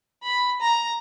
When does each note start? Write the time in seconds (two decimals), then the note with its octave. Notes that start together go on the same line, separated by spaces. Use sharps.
0.23 B5
0.61 A#5